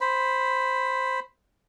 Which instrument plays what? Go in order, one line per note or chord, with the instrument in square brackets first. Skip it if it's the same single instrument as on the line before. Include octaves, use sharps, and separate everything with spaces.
[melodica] C5 B5